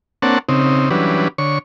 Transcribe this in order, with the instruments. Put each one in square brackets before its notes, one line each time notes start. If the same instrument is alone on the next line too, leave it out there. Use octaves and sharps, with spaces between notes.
[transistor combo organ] A#3 C4 D4 C#5 F#5 A5
C#3 C4 D#4
E3 F#3 G3 C#4 D4 B4
D3 C#5 C#6